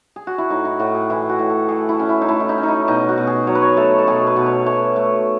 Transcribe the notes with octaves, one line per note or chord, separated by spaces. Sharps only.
G#4
F#4
E4
A2 D#4
E4
A2 F#4
G#4
E3 E4
F#4
A2
A4
A3 G#4
E4
C#4
E4
D#4
A3 E4
E4
D#4
C#4
D#4 E4
B2 D#4
F#4
B2
G#4
F#3 C#5
B4
C#5
A3 A4
A4
B2 G#4
B4
B2
C#5
A3 C#5
A3